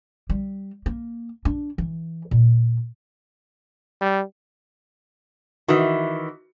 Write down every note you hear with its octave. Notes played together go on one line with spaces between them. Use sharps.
G3
A#3
D4
E3
A#2
G3
D#3 E3 F#4